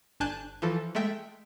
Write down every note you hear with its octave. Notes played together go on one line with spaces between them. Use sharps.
G1 D4 G#5 A5 F#6 G6
E3 F3 A4
G#3 A3 E5 G5